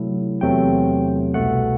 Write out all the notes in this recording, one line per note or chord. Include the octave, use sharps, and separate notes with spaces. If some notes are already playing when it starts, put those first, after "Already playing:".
Already playing: C3 F#3 A3 E4
E2 C3 F#3 A3 C4 G5
C2 B2 A3 F#5